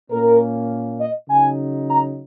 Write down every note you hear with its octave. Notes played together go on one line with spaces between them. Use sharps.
A#2 A#3 C#4 A#4
D#5
C#3 F#3 D#4 G#5
A#5